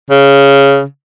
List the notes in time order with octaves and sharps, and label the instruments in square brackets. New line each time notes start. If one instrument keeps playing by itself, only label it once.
[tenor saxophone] C#3